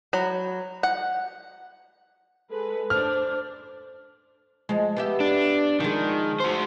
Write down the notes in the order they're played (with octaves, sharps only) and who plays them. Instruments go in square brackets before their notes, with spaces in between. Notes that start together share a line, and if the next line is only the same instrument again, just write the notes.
[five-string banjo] F#3 B5
F#5
[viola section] G#3 B4 [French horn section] A4
[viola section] D4 [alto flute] C5 [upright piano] F6
[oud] F3 G#3
B3 G4 E5
[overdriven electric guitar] D4
[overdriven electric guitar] D#3 [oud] F3 G#3
[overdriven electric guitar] F#4 C5